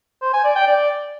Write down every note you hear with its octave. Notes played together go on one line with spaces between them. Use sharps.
C5
G#5
D5
G5
D5